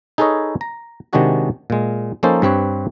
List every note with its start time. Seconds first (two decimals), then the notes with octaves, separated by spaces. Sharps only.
0.18 D#4 G#4 A4 B4 C#5 D#5
0.61 A#5
1.13 C3 D#3 G#3 D4 F#4 G#4
1.70 A#2 G#3
2.23 F3 A#3 C#4 D#4 A4 C5
2.42 G2 C4 B4 C#5